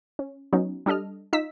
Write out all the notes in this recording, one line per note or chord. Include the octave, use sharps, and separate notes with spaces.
C#4
F#3 B3 C#4 D#4
G3 D4 A4 D#5 F6
D#4 F4 E6 B6